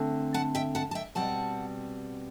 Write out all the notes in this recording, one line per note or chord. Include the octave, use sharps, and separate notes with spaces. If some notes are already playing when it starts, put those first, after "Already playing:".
Already playing: D3 A3 C4
F#5 A5
E5 G5
F#5 A5
A5
E5 G5
B2 G3 C4 F#5 A5